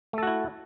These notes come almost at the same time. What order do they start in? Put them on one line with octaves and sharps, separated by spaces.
A3 A4 F#4 E4